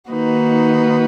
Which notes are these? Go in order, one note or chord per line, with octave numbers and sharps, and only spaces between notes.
D#3 A#3 D#4 F#4 B4